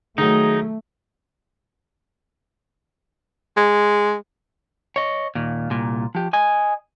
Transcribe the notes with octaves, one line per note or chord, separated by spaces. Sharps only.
D#3 F#3 A3 D#4 G#4
G#3
C#5 D#5
D#2 A#2
C2 A#2
F3 G4
D#5 G#5